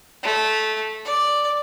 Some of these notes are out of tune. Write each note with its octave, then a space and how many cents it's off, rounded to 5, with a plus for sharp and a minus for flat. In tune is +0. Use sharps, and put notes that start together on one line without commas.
A3 -15
D5 +0